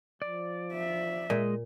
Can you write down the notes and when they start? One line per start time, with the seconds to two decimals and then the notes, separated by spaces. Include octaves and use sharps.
0.22 F3 D5
0.73 E5
1.30 A#2 G#3 D#5